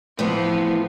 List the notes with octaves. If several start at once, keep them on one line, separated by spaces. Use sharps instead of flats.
A2 E3 F3 A3 B3 C4